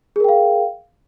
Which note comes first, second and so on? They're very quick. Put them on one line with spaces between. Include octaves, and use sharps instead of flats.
G#4 A#4 G5 F5